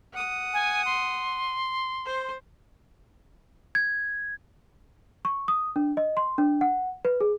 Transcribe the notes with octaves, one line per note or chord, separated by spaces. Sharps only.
F#5 D#6
G#5
C6
C5
G#6
C#6
D#6
D4
D#5
C6
D4
F#5
B4
G#4